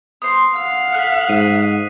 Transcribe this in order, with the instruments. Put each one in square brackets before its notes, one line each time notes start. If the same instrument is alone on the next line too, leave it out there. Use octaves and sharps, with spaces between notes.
[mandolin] B3 C5 C6 [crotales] D#6 C7
[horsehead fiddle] F5 F#5 [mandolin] E6
[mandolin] A4 A#4 [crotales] F#6 B6
[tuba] G#2 [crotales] D#7